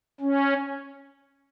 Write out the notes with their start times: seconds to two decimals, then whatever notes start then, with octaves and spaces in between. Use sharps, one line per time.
0.20 C#4